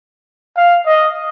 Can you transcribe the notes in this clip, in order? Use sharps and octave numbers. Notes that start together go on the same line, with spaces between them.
F5
D#5